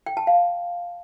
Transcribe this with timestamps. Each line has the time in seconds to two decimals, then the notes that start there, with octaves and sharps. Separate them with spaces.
0.06 G5
0.17 A5
0.27 F5